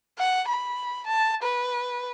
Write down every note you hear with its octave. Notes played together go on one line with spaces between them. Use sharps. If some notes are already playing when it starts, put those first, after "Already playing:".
F#5
B5
A5
B4